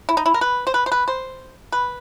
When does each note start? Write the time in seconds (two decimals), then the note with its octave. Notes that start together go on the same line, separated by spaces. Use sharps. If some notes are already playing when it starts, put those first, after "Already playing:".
0.09 E4
0.17 D#4
0.26 E4
0.34 A#4
0.41 B4
0.67 C5
0.74 B4
0.86 C5
0.92 B4
1.08 C5
1.72 B4